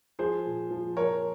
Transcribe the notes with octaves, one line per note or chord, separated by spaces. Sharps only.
F3 G#4 C5
A#2
F3
F3 A#4 C#5